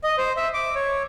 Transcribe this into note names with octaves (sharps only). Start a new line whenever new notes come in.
D#5
C5
E5
D6
C#5